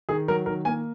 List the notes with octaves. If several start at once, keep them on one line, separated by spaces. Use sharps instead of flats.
D#3 G#4
F#3 A#4
D#3 A#4
A#3 G#5